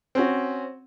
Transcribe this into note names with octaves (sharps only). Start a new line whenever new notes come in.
C4 C#4 F#4